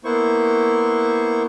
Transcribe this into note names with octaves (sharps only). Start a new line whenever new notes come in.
A#3 B3 E4 C5 C#6